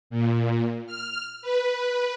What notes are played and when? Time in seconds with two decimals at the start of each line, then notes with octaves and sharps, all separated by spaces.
0.10 A#2
0.87 F6
1.42 B4